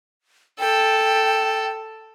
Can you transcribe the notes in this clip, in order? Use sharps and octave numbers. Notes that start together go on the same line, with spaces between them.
A4 G5